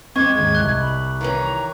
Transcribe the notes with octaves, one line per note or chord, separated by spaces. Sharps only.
G#3 C4 C#6 D6 G#6
D#2 G#2 G#6
C2 F#6 G7
B5
D#3 E3 C#4 A#5